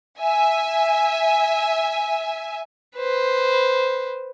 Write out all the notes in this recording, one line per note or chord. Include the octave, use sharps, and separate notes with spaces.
E5 G#5
B4 C5